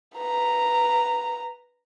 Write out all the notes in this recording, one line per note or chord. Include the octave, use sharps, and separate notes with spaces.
B4 A#5